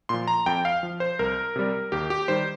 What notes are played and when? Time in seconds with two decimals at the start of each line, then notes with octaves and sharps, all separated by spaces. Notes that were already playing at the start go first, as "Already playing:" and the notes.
0.09 A#2 F3 C6
0.27 A#5
0.46 F2 G5
0.65 F5
0.83 F3
1.00 C5
1.19 C2 A#4
1.56 C3 G3
1.92 D#2 G4
2.10 G4
2.28 D#3 G3 C5